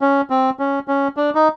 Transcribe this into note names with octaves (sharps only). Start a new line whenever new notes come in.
C#4
C4
C#4
C#4
D4
D#4